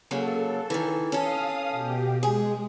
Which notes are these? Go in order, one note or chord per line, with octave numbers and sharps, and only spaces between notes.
C#3 F#3 A#3 A4
D#3 E3
C#4 A4 F5 D#6
B2 G4
G#3 G#4